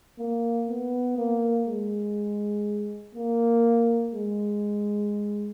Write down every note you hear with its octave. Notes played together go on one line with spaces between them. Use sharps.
A#3
B3
A#3
G#3
A#3
G#3